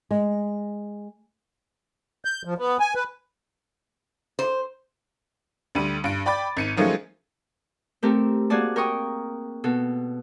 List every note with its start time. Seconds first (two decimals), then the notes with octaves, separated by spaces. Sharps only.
0.11 G#3
2.25 G6
2.45 F3
2.58 B3
2.80 G#5
2.95 B4
4.39 C5
5.75 D2 D3 G3 D#7
6.04 G2 D7
6.26 D5 G5 B5 D6 A6
6.57 G#1 C#7 D#7
6.77 D#3 F3 F#3 G#3 A3 C#4
8.02 A3 C4 G4 A4 A#4
8.50 A#3 F#4 G#4 D5 A5
8.76 A#4 G5 C#6 D#6
9.64 B2 A4